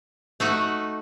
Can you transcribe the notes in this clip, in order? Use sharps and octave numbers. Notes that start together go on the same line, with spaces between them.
A3 D#4 F#4